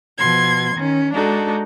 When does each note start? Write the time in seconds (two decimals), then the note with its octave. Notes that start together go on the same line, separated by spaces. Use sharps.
0.18 B2 F3 C6 G#6
0.75 D#3 C#4
1.14 G#3 D4 D#4 F#4 A4